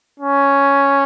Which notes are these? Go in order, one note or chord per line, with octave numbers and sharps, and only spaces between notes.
C#4